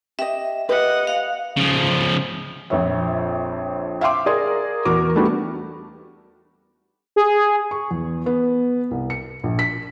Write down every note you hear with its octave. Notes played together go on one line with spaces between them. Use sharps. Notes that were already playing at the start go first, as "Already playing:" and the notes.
G4 D#5 E5
G4 B4 D#5 F#5
F5
C#3 F3
A#1 F2 C#5 E5
E5 F5 G5 C6 D6
G#4 A#4 D5 C6
E2 F#4 A#4 D6
G3 A3 B3 D4 F#4 G4
G#4
C#6
E2
B3
C2
C#7
A#1
B6